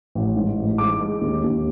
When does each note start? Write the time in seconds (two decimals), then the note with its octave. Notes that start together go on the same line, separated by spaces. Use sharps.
0.15 A1
0.36 G#2
0.58 A1
0.78 G#3 D6
1.01 G#3
1.21 D#2
1.43 D#2